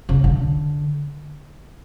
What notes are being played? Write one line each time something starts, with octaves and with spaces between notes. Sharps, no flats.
C#3
D3